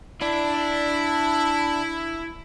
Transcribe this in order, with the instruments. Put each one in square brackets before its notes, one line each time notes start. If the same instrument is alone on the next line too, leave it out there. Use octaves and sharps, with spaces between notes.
[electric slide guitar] D4 D5 [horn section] E4